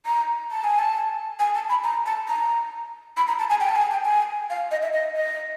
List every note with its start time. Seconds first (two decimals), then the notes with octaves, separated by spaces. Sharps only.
0.06 A#5
0.51 A5
0.64 G#5
0.79 A5
1.39 G#5
1.55 A5
1.69 B5
1.84 A#5
2.06 A5
2.28 A#5
3.17 B5
3.28 A#5
3.39 A5
3.50 G#5
3.60 G5
3.68 A5
3.76 G#5
3.91 G5
4.05 G#5
4.50 F5
4.71 D#5
4.82 E5
4.93 D#5
5.16 D#5